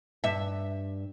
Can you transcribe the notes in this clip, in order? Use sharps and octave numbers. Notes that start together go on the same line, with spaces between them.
G2 E5